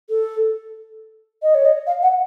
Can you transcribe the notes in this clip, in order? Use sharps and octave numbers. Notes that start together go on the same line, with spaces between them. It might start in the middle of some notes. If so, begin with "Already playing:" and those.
A4
D#5
C#5
D#5
F5
F#5